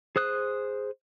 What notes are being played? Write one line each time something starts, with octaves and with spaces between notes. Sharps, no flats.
G#4 C5 D#6 F#6